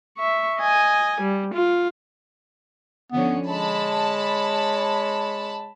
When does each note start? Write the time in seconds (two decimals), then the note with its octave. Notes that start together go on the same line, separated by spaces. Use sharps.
0.18 E5 C#6
0.60 D#5 G#5
1.21 G3
1.54 F4
3.12 D3 F3 B3 C#4
3.48 G#3 C#5 A5 B5